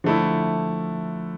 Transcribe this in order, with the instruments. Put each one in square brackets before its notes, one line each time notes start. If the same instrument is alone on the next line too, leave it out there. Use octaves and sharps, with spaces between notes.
[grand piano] D3 A3 E4 [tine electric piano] F3